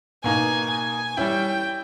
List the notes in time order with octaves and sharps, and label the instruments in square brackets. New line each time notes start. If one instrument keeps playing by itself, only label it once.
[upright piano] B2 A#3 D#4 [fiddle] G#5
[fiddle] G#5
[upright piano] G3 C#4 E4 [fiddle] G5